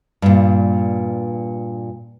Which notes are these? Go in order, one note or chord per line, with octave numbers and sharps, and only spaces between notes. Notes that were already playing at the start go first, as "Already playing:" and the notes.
G2 A#2